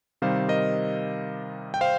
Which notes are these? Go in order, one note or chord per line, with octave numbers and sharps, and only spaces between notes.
C3 D#3 G3 C5 F5
A#4 D#5
G5
C5 F5